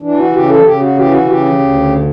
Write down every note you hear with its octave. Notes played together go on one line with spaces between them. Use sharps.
E3 D4
F#4
C#3 G4
A4
C#3 G4
F#4
E3 G4
F#4
C#3 G4
D2